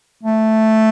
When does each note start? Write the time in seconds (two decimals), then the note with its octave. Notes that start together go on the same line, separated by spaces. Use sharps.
0.23 A3